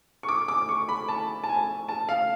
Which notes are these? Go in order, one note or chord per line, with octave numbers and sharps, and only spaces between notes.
C#6
D6
D6
C#6
B5
A5
A5
G#5
A5
F5